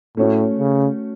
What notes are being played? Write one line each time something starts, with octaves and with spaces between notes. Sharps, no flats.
A2 A3 C#4 F#4
C#3